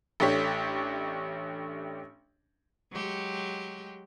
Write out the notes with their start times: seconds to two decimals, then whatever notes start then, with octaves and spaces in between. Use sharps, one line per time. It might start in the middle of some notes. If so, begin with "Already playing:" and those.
0.20 A1 A3 D4 G4 C#5 B6
2.92 F#3 G#3 G4